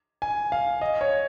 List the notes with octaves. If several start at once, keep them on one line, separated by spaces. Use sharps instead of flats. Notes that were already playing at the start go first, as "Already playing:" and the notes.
G#5
F5
D#5
C#5